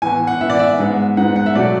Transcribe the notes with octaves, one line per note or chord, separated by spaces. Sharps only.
A2 E3 B3 G#5
F#5
A2 E3 B3 E5
D5
E5
G#2 G#3 B3
G#2 G#3 B3 F#5
F#5
E5
B2 F#3 A3 D5